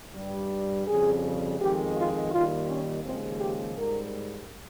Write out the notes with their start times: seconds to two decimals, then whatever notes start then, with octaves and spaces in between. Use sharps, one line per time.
0.14 G2 G3
0.87 F2 C#3 G3 G#4
1.59 F2 D#3 G#3 G4
1.95 F4
2.31 D#2 D#3 G3 F4
2.67 C#4
3.03 D#2 C#3 F3 G#3 C4
3.40 G4
3.76 G#2 G3 A#4